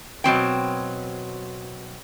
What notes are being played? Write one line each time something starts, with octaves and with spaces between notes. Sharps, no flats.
B2 F#3 C4 G5